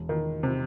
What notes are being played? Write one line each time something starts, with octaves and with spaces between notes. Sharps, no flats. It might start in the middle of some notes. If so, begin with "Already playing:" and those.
Already playing: E1
D#3
C3